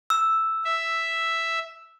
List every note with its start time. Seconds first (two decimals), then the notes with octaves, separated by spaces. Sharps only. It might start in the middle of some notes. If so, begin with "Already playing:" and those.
0.10 E6
0.64 E5